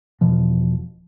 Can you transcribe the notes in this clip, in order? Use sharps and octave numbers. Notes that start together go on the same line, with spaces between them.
E1 B2 F3